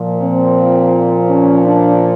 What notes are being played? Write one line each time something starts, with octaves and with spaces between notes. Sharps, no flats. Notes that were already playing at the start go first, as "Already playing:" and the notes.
Already playing: A#2 F3
C4
C#4
D4